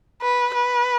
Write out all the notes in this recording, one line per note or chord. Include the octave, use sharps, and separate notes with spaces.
B4
B4